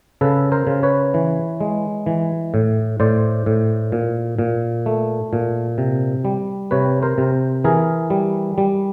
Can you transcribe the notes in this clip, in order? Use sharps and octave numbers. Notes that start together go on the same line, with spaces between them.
C#3 A4 B4
A#4 C5
C#3
B4 C#5
E3
G#3
E3
A2
A2 C5 D5
A2
A#2
A#2
A3
A#2
C3
G3
C3 B4 C#5
A#4 C5
C3
E3 G#4 A#4
G3
G3